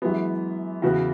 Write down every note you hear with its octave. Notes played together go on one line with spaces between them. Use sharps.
F#2 E3 G#3 B3
E2 C#3 E3 B3 F#4